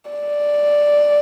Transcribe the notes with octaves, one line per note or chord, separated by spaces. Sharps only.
D5